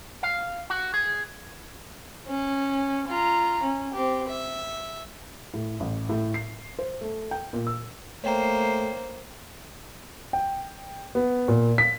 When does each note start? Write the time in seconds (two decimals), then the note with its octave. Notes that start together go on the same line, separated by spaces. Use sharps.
0.23 F5
0.70 F#4
0.94 G#4
2.27 C#4
3.07 F4 A#5
3.62 C#4
3.93 C4 G4
4.29 E5
5.54 A2
5.80 A1
6.09 A2
6.34 C7
6.79 C5
7.01 A3
7.31 G5
7.53 A#2
7.67 E6
8.24 A3 A#3 C5 C#5 G5 A#5
10.33 G5
11.15 B3
11.48 A#2
11.78 B6